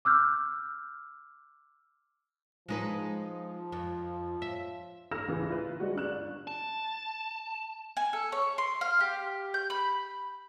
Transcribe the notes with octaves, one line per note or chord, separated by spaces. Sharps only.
D6 E6 F6 G6
F3 G#3 D#4 B4
F2
E5
A4 E6 F6 A#6 E7
C#2 C#3 E3
E4 F4 B4
G3 G#3 F#4
G1 C#4 D4 F#6 E7
A5
G#5
A4
C#5
C6
F5
G4
G6
B5